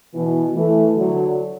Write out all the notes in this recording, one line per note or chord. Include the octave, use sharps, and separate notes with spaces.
B2 E3
E3 A3
D3 F#3